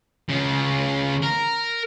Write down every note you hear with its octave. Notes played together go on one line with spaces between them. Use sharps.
C#3 F4
A#4